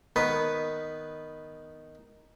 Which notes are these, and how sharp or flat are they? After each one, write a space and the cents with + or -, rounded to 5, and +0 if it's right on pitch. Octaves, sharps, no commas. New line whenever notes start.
D#3 +0 B3 +0 B4 +0